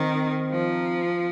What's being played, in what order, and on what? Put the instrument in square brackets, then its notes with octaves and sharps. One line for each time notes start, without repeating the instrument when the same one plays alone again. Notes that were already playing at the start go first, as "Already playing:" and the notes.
Already playing: [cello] D#3 [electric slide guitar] C4 D#4
[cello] F3